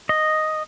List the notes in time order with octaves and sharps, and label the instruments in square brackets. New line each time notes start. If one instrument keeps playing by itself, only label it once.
[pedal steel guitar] D#5